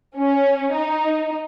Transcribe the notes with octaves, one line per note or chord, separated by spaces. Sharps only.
C#4
D#4